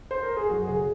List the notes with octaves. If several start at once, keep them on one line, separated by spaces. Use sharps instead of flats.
C5
A#4
G#4
F#2 F#4
C#3 G#4